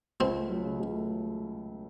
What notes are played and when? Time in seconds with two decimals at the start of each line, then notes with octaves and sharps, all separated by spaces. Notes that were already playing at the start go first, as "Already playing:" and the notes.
0.20 C#2 C4
0.36 A3
0.50 F#3
0.64 C#3
0.80 C#2
0.94 A3